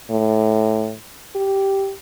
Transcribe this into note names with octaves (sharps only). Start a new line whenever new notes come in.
A2
G4